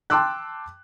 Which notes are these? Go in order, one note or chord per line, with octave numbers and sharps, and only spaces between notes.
G5 A5 C6 D6 E6 F#6